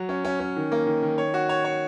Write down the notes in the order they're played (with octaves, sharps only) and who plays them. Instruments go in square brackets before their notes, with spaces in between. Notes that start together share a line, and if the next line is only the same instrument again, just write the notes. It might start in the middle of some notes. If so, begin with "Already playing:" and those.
Already playing: [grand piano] F#3
C#4
C#4
C#4
D#3
A#3
D#3
D#3
C#5
F#4
C#5
C#5